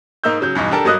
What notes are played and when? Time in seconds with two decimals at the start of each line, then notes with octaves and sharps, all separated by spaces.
0.24 G#2 A#3 D#4 E6 G6
0.40 C#3 F#3 G6
0.55 E2 G2 B2 D#4
0.71 D4 G4 A4 A#4 A5
0.85 G2 F#3 A#3 D#5 D#6 F#6